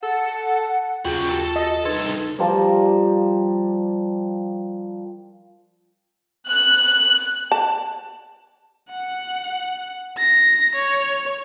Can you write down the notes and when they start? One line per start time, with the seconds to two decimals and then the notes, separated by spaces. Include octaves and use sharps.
0.03 A4 F#5
1.05 D#2 C#3 F4 F#4 G#4 G5
1.29 G4 A4 A5
1.56 F#4 D#5
1.85 C2 D#4 A4 B4 C6 G#6
2.38 F3 G3 A#4 D5
6.49 F#6
7.52 A5
8.90 F#5
10.17 A#6
10.75 C#5